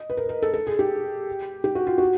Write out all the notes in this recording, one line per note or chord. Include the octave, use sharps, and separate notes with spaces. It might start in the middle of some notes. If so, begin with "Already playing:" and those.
Already playing: D#5
B4
A#4
A#4
A4
A4
G#4
G4
G4
F#4
F4
F#4